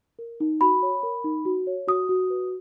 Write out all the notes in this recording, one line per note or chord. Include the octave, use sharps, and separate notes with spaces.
A#4
D#4
F#4 B5
C#5
A#4
D#4
F#4
C#5
F#4 D#6
F#4
B4